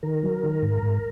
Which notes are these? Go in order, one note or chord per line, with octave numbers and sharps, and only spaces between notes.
D#3 A#4
F#3
D#3
G#2
G#2